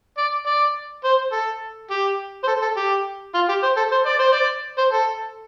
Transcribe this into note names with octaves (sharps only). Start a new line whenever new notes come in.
D5
D5
C5
A4
G4
C5
A4
A4
G4
F4
G4
C5
A4
C5
D5
C5
D5
C5
A4